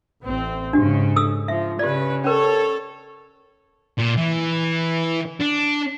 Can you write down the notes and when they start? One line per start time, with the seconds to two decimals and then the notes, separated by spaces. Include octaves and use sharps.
0.22 A1 C4
0.73 G#2 C#3 D4 F#4 G4
1.16 A4 D#6 E6
1.48 F3 E5
1.79 C#3 G4 B4 D5
2.24 C#4 A4 A#4 C#5
3.98 A#2
4.17 E3
5.41 D4